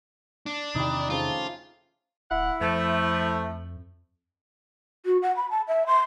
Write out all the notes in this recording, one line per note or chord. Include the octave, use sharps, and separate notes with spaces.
D4
E2 C3 D#3 D#4 E4 G4
C#3 F3 A3 F4
D1 E4 F#5
F2 F3 A3
F#4
F#5
B5
A5
E5
C6